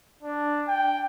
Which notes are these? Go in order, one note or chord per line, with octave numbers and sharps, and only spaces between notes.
D4
G5